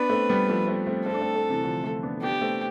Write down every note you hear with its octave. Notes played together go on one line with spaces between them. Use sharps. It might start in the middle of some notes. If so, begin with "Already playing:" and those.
Already playing: B3 D4 B4
A3 C4
G3 B3
F3 A3
A3 C4
A3 C4
A3 C4 A4
D4
A3 C4
A3 C4
C3 E3
D3 F3
F3 A3
B3 D4
B3 D4 G4
A3 C4